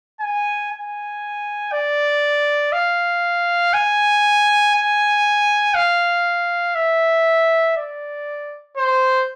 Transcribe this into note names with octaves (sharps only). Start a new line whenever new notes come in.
G#5
G#5
D5
F5
G#5
G#5
F5
E5
D5
C5